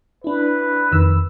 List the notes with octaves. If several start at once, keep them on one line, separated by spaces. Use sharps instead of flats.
D4 E4 B4
F2 D#3 E6